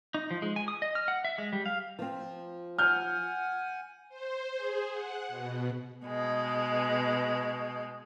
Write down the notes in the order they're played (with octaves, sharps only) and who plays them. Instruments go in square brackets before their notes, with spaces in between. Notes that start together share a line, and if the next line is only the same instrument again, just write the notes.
[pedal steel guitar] D#4
F3
G#3
G#5
D#6
D#5
F6
F#5
E5
G#3
G3
F5
[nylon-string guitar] F3 C4
[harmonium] F#5 G#5 [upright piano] F6 G6
[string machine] C5
G#4
F#5
B2
[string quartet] B2 G#3